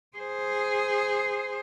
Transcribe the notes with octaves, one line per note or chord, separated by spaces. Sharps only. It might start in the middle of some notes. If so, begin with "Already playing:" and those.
G#4 C5